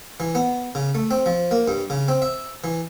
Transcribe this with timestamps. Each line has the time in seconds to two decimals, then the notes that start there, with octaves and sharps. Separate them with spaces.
0.20 E3
0.35 B3
0.75 C#3
0.95 A3
1.11 C4
1.26 F3
1.51 A#3
1.68 G2
1.90 C#3
2.08 C4
2.22 E5
2.64 E3